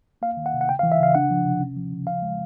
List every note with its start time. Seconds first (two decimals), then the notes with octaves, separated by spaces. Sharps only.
0.22 A#3 F5
0.37 D#3
0.46 F#5
0.53 C3
0.61 F#5
0.69 C#3 G5
0.79 F5
0.83 E3
0.92 E5
1.00 C#3 F5
1.15 D4 F#5
1.31 F3
1.45 C3
1.61 C#4
1.76 F3
1.92 C#3
2.07 F3 F5
2.22 G#3